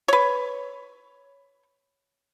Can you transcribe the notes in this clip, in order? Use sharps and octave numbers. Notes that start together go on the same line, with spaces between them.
B4 C#5